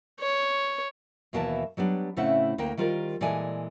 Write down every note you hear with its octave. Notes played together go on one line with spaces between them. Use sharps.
C#5
D#2 B2 E3 A#3 E4 A5
F#3 G3 B3 D4
A2 C#3 A3 C4 E4 F#5
D2 A#3 A#4 G5
D#3 G3 F4 A#4 C5
A#2 E3 G#3 A4 D5 G#5